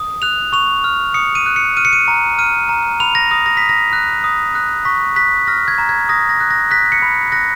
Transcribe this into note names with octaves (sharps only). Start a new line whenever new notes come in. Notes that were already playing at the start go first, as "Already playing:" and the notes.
Already playing: D#6
F#6 F7
C#6 F7
F6
D#6 C#7
D#7
F#6
C#7
F6 D#7
C#7
D#7
A#5
F6 D#7
A#5
B5 F7
A#6
D#6 A#6
A#6
D#6 B6
A#6
F#6
D#6
F#6
C#6 B6
F#6 B6
F6 A#6
G#6
A#5
G#6
D#6 A#6
A#6
F#6
A#6
F#6 B6
C#7
B5
F#6 A#6